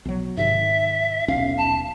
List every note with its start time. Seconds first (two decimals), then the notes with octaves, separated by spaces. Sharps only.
0.05 B1 F#3
0.37 G#2 C3 D#3 E5
1.28 D#1 B1 C#4 F5
1.57 A5